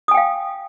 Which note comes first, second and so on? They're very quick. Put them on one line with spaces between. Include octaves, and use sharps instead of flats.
D#6 G#5 G5 F5